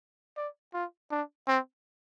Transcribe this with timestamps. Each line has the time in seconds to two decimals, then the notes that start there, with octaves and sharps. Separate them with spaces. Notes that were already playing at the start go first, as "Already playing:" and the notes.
0.37 D5
0.73 F4
1.11 D4
1.47 C4